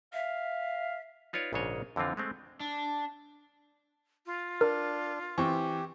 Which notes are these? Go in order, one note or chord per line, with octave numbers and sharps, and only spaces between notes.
E5 F5
D#4 F4 B4 C#5 D5 F5
A#1 G#2 C#3 D4 C#5 D#5
F2 D3 E3 C4 F4
G#3 A3 C4
D4
F4
D4 A#4
E3 C4 G4 C#6